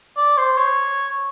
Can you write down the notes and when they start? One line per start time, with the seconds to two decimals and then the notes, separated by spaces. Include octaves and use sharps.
0.17 D5
0.37 C5
0.58 C#5